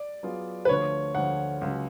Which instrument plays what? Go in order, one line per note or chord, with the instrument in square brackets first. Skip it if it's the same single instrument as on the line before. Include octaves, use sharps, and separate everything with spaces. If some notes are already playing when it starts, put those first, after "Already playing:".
Already playing: [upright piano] D5
[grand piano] F#3 B3 F4 G#4
[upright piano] B4
[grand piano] D2 D3 F3 A3 F4 [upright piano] C#5
[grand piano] D2 D3 F3 A3 F4 [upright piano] F#5
[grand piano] C#2 C#3 F#3